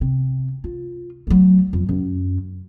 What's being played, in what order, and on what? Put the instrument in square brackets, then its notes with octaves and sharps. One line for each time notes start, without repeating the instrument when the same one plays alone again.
[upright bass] C3
F4
F#3 A3
F2
F#2